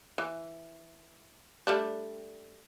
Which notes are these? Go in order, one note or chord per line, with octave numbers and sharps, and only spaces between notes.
E3
G3 A3 D4